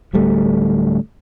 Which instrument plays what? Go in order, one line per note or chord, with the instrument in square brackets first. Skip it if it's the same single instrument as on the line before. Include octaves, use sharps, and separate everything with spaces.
[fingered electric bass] D1 D2 G3 A3